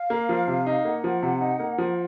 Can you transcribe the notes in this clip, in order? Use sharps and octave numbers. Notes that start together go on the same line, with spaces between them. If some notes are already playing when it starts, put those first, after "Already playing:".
Already playing: F5
A#3
F3
C3
D#4
A#3 F#5
F3
C3
D#4
A#3
F3